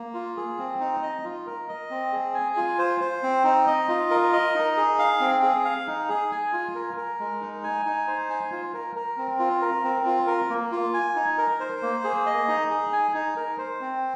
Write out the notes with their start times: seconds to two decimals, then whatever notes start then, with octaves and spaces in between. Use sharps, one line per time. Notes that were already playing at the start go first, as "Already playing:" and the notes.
Already playing: A#3
0.14 F4
0.37 G#4
0.58 C4
0.80 D#4
1.02 D#5
1.24 F4
1.47 A#4
1.68 D#5
1.90 C4
2.13 G#4
2.34 G#5
2.57 F4
2.79 C5
3.00 C5
3.23 C4
3.44 D#4
3.67 D#5
3.89 F4
4.11 A#4
4.33 D#5
4.55 D#4
4.77 G#4
4.99 F5
5.21 C4
5.43 G#4
5.65 F5
5.87 D#4
6.09 G#4
6.31 G#5
6.53 F4
6.75 A#4
6.97 A#4
7.20 G#3
7.41 D#4
7.64 G#5
7.86 D#4
8.08 C5
8.29 G#5
8.52 F4
8.74 A#4
8.96 A#4
9.18 C4
9.39 F4
9.62 A#4
9.84 C4
10.06 F4
10.27 A#4
10.50 A#3
10.72 F4
10.94 G#5
11.16 D#4
11.38 A#4
11.60 C5
11.82 A#3
12.04 G#4
12.26 D#5
12.48 D#4
12.70 G#4
12.93 G#5
13.14 D#4
13.36 A#4
13.58 C5
13.81 C4